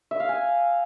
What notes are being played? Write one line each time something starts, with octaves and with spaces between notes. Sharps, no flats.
E5
F5
G#5